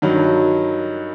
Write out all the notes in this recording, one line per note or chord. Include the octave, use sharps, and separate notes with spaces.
G2 D#3 F#3